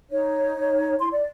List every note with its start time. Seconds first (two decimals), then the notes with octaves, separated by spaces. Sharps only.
0.11 D#4 C#5
0.99 E4 C6
1.12 D5